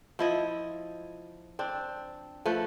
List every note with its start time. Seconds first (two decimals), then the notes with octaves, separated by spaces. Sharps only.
0.19 F3 E4 D#5
1.59 C4 D4
2.45 F3 A3 B4